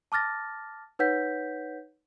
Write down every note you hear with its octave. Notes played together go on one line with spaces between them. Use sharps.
A5 D6 F6 A6 A#6
D#4 B4 C#5 F#5 G6 B6